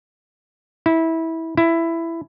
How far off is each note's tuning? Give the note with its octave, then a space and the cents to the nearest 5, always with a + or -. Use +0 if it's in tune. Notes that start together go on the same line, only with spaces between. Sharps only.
E4 -20
E4 +10